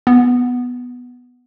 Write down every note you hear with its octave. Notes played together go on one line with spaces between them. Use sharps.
B3